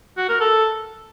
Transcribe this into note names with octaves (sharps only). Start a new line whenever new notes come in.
F#4
A#4
A4